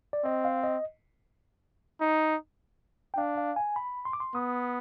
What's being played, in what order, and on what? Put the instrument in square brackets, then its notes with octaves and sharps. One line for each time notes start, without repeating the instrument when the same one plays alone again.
[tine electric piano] D5
[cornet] C4 [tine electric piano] D#5
[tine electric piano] F5
D#5
[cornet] D#4
[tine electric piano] G5
[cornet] D4 [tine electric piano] F5
[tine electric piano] F5
G#5
B5
C6
D6
C6
[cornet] B3 [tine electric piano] D#6